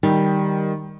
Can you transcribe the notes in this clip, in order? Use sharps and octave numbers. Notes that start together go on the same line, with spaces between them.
D#3 G3